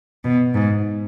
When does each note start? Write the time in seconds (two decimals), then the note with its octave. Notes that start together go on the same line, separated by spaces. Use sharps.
0.25 B2
0.54 G#2